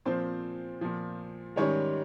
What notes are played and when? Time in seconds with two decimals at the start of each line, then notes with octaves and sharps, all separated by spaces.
0.05 A#2 F3 C4 C5
0.81 A#2 F3
1.56 G#2 D#3 G3 C#4 C#5